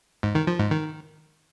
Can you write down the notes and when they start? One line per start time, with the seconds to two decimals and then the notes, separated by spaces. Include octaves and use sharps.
0.23 G#2
0.35 D#3
0.47 F3
0.59 G#2
0.71 D#3